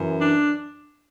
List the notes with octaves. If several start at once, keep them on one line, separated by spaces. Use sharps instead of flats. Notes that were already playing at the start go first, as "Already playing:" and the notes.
Already playing: F#2 E3
D4